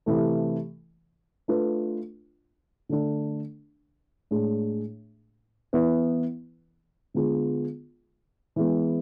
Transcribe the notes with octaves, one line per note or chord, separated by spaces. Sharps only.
C3 E3 A3
A3 D4 F4 B4
D3 A3 D4
A2 G#3 D4 G#4
E3 B3 E4 B4
D3 G#3 B3 F4 G#4
E3 G#3 B3